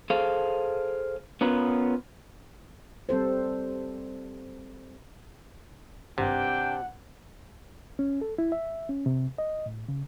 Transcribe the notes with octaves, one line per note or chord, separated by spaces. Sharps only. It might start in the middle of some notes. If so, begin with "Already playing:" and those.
G#4 A4 C5 F5
B3 C#4 F4 A#4 B4
G3 C4 A4 C5
G#1 G2 C3 D4 F#5 G5
C#4
A4
E4
E5
C#4
C3
D#5
A2
C#3